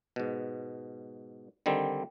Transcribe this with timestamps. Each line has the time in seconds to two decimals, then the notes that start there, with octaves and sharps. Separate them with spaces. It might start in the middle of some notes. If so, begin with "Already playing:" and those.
0.16 G#2 B2
1.66 D3 D#3 G3 C4